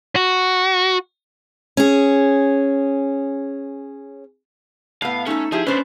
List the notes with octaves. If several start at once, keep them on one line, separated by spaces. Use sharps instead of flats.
F#4
C#4 G#4
A2 B3 F5
A3 C#4 D#4 A4
F3 E4 G4 G#4
C#4 D4 B4 C5